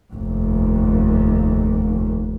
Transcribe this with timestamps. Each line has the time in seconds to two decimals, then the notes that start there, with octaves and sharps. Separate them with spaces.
0.13 F1 D#2